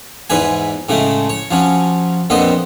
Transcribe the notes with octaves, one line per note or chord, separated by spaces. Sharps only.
E2 G#2 E3 B4 G#5
A2 C#3 G#3 A3
C#5
F3 F#3 C#4
A#1 F2 A#2 B3 C4 D#5